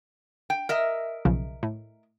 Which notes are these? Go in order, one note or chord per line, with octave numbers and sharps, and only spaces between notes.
G5
A#4 D#5 E5
B1 C#3 F3
A2